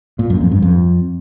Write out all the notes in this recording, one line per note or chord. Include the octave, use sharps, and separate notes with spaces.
A#2
F#2
F2
G2
F2